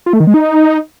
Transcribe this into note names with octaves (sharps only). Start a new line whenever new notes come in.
F4
A3
D#3
G#3
D#4